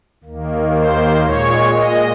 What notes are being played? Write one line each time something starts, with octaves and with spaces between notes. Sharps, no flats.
D#2 D#3 A#3
C5
A#2 G#3 C#5
D#5